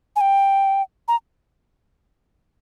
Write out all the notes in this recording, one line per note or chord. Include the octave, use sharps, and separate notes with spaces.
G#5
G5
A#5